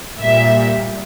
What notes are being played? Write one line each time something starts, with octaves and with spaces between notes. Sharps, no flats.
A#2 G3 E5